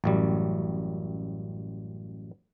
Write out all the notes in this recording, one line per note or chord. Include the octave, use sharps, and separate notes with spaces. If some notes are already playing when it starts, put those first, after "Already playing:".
A1 F#2 G3